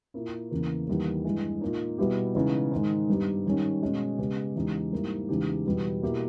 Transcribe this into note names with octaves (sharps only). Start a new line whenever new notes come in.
A#2 A#3 E4
E2 C#3 E3 A#3
E2 D#3 G3 A#3
G2 E3 G#3
A#2 A#3 D#4
B2 G3 B3 E4 G4
C#3 E3 G#3 B3 D#4
G#2 D#3 G#3
G2 G3 B3 D#4 G4
G#2 D#3 G3 C#4
B2 G#3 C#4
C#3 G#3 B3 G4
E2 C#3 G#3 D#4 G4
G#2 G3 A#3 E4
E2 C#3 G#3 D#4 G4
E2 B2 G3 B3 G4
B2 A#3 E4 G4